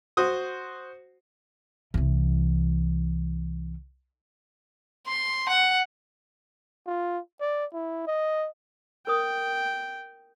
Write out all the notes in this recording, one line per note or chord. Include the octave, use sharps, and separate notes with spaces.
F#4 C5 D#6
C2 E3
C6
F#5
F4
D5
E4
D#5
A#4 C5 G5 D#6